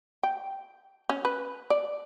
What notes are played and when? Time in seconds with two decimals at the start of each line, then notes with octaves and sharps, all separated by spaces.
0.23 G5
1.09 C#4
1.25 B4
1.70 D5